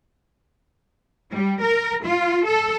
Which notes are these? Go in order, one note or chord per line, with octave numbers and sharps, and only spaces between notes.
G3
A#4
F4
A4